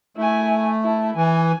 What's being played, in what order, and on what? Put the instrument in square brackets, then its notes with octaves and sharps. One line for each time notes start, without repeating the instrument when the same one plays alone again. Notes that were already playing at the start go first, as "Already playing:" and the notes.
[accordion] A3 [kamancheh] E4 G#5
[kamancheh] E4 A5
[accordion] E3 [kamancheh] G#5